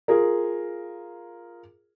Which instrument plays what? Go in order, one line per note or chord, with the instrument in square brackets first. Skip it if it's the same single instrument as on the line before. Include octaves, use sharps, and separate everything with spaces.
[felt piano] F4 G#4 A#4